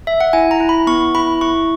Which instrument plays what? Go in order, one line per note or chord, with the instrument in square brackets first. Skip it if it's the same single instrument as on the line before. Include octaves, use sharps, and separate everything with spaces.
[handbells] E5
F#5
E4 G#5
A#5
E4
B5
B3 C#6
E4 B5
E4 C#6